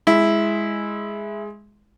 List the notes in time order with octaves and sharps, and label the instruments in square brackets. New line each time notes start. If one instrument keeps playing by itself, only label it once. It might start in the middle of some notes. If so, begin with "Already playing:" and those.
[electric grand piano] G#3 [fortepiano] E4